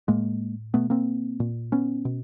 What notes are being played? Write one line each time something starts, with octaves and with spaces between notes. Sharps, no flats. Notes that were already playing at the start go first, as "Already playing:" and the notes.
A2 G#3 A#3
B2 A3 B3
A#3 C4
A#2
B3 C#4
B2